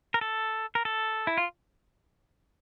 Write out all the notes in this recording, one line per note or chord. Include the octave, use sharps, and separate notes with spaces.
A#4
A4
A#4
A4
E4
F4